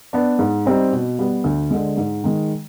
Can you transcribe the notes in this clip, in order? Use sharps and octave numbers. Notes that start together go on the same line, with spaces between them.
B3 D4
G#2
G3 C4 D#4
B2
G3 B3
D2
D3 G#3
G#2
D#3 G#3